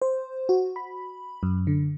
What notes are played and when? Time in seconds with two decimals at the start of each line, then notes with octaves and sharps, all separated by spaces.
0.02 C5
0.49 F#4
0.76 B5
1.43 F#2
1.67 D3